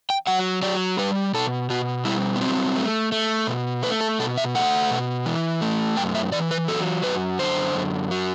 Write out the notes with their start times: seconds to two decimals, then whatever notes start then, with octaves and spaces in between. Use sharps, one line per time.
0.10 G5
0.27 F#3 F#5
0.62 F#3 D5
0.98 G3 B4
1.34 B2 A4
1.70 B2 F#4
2.05 G3 E4
2.36 B3
2.41 F#3 C4
2.76 A3
3.12 A3
3.47 B2
3.83 A3 B4
4.01 A4
4.20 B2 A4
4.37 E5
4.55 A3 F#5
4.91 B2
5.26 E3
5.61 A3
5.97 F#2 G5
6.15 E5
6.32 E3 D5
6.51 B4
6.68 F#3 A4
7.04 F#2 B4
7.39 D3 C5
7.75 F#2
8.11 F#3